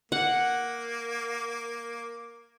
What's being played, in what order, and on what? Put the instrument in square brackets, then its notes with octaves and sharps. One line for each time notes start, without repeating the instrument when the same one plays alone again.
[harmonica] A#3 [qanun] F#5